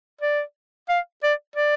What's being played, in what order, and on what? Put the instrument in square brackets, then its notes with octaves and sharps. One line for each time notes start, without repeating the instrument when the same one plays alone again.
[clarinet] D5
F5
D5
D5